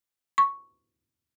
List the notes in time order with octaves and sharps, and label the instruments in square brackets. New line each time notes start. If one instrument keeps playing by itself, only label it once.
[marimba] C#6